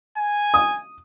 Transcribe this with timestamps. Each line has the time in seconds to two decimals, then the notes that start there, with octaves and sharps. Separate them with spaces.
0.17 G#5
0.54 D#6